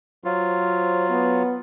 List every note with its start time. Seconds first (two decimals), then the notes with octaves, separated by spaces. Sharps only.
0.24 F#3 F4 C5
1.10 B3